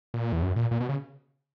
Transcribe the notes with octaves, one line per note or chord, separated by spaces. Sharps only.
A#2
E2
F#2
A#2
A#2
B2
C#3